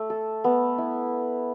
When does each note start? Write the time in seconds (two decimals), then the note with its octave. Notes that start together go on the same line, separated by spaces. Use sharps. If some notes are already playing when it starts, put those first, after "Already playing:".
Already playing: A3
0.10 A4
0.44 B3
0.78 E4